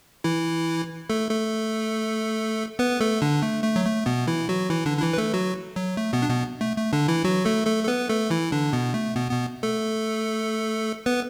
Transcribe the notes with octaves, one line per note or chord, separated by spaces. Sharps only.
E3 E4
A3 A4
A3 A4
B3 B4
A3 A4
D3 D4
A3
A3
F#3
A3
B2 B3
E3 E4
F#3 F#4
E3 E4
D3 D4
D4
E3 E4
B4
A3 A4
F#3 F#4
F#3
A3
B2 B3
D4
B2 B3
A3
A3
D3 D4
E3 E4
F#3 F#4
A3 A4
A3 A4
A4
B3 B4
A3 A4
E3 E4
D3 D4
B2 B3
A3
B2 B3
B2 B3
A3 A4
B3 B4